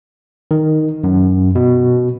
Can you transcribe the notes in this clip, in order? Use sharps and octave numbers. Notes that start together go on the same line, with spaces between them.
D#3
F#2
B2